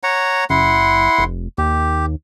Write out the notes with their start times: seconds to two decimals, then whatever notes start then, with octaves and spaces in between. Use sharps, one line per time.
0.03 C#5 F#5 A#5
0.50 F#1 E4 F#5 C6
1.18 F1
1.58 D#2 G4